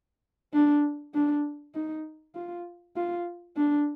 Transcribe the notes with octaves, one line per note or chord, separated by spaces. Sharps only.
D4
D4
D#4
F4
F4
D4